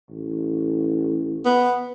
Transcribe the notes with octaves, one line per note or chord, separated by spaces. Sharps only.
A1
B3